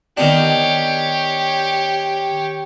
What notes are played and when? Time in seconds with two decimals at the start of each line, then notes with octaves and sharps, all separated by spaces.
0.17 D#3 B3 D4 G4 C#5